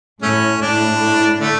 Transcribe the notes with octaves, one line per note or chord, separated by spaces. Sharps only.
A2 A3 C#4
A2 D4
D3 A3